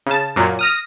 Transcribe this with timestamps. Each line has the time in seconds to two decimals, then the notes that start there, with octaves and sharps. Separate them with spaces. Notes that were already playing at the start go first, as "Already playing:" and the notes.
0.06 C#3 A5
0.36 F#2 A#2 F#3
0.59 D#6 F6 A#6